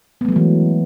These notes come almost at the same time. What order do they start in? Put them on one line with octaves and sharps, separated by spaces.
B3 A3 F#3 G#3 E3